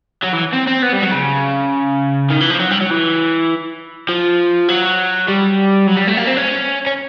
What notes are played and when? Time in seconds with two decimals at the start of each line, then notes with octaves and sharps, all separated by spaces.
0.23 F#3
0.32 E3
0.53 C4
0.67 C4
0.82 B3
0.93 G3
1.03 F#3
1.12 C#3
2.30 D#3
2.41 E3
2.50 F3
2.60 F#3
2.71 G3
2.81 F#3
2.91 E3
4.09 F3
4.69 F#3
5.28 G3
5.87 F#3
5.97 G3
6.08 A3
6.17 A#3
6.27 C4
6.37 C#4
6.86 C#4